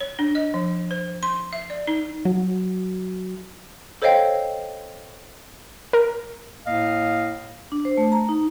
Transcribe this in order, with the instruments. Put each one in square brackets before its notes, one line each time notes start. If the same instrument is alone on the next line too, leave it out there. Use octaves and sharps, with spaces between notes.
[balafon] C#5
D4
D#5
F3
C5
C6
E5
D5
D#4
[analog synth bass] F#3
[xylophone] A4 C5 C#5 D#5 F5 G5
[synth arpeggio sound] A#4
[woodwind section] A2 A#3 D#5 F5
[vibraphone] D4
C5
A3
A#5
D#4